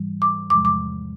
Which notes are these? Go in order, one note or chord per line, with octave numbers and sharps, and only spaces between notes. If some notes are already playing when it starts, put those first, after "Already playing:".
Already playing: G#2 E3 G3
D6
E2 C3 F3 G#3 D6
D6